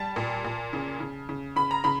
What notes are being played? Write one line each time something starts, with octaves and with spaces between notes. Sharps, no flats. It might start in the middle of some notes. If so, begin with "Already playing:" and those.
Already playing: G3 A5
A#2
A#2
C#3
C#3
C#3
C#3 B5
A#5
C#3 B5